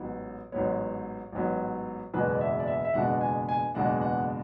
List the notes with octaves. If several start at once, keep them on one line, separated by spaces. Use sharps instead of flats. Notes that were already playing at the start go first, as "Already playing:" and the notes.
Already playing: A1 G#2 F#3 B3
A1 G#2 F#3 B3 C#5
A1 G#2 F#3 B3
F#1 E2 B2 G#3 D4 B4
D5
E5
D5
E5
E5
F#1 E2 B2 G#3 D4 F#5
G#5
G#5
F#1 E2 B2 G#3 D4 F#5
F#5